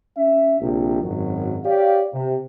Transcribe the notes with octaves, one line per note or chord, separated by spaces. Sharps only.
C#4 E5
A#1 C3
G#1 F#2 F#3
G4 C#5 D5 F5
C3